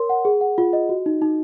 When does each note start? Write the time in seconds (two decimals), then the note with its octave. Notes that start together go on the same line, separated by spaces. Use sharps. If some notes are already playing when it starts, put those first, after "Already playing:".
Already playing: A#4 C#5 C6
0.09 F#5
0.25 G#4
0.41 F#5
0.58 F4
0.73 D#5
0.89 F#4
1.06 D#4
1.22 D#4